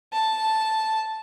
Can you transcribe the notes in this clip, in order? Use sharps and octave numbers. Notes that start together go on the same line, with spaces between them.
A5